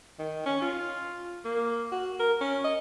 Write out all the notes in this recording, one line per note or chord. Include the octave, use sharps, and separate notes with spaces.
D#3
C#4
F4
A#3
F#4
A#4
C#4
D#5